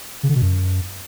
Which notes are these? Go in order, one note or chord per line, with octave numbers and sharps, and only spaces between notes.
C#3
D3
B2
F#2